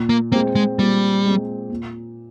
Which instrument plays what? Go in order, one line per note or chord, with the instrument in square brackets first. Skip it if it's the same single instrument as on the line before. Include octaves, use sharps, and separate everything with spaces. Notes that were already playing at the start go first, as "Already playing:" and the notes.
Already playing: [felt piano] A#2
[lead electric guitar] A#3
[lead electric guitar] A#3 [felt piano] C4
[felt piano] G#3
[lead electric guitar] G#3
[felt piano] A#2 [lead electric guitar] G3
[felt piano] G#3 C4
A#2